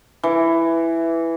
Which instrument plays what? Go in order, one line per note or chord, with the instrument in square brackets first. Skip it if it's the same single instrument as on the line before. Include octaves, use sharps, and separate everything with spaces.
[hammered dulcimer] E3